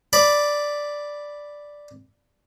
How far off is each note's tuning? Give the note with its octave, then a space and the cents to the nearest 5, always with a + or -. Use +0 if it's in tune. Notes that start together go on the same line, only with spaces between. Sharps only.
D5 +0 B5 +0